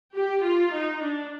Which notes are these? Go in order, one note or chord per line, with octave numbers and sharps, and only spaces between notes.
G4
F4
D#4
D4